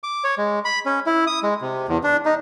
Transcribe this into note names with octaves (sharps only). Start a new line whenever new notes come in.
D6
C#5
G#3
B5
C#4
E4
D#6
G#3
C3
E2
D4
D#4